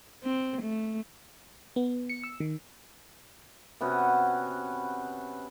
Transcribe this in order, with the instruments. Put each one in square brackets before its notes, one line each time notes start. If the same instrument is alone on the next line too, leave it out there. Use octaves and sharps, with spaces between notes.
[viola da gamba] C4
A3
[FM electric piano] B3
C#7
E6
D#3
[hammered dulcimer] C3 B3 C#4 F#4